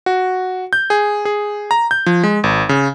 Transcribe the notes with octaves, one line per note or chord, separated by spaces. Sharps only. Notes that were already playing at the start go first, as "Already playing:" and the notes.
F#4
G6
G#4
G#4
A#5
G6
F3
G#3
G#1
C#3